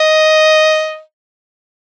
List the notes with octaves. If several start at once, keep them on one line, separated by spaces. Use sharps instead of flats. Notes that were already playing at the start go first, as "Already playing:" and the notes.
Already playing: D#5